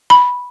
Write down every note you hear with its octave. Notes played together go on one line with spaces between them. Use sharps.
B5